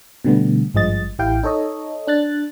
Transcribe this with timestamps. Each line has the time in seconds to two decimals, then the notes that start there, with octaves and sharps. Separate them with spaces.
0.25 B2 D3 G3 A3 B3
0.74 G#1 G2 F3 G#3 D#5 A6
1.19 A1 E4 G4 F5 G5
1.43 D#4 A4 C#5 D#5
2.07 D4 F#6 A6